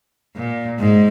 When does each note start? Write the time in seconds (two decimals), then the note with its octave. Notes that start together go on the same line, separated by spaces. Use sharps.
0.36 A#2
0.79 G#2